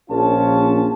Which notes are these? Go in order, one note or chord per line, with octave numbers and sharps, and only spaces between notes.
A#1 C#4 F4 A5